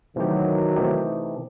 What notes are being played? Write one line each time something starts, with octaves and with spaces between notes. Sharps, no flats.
C3 D#3 E3 F#3 A3 D#4 G4
C3 E3 A3 D#4 G4